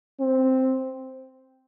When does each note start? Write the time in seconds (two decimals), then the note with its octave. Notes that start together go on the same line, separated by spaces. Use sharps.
0.20 C4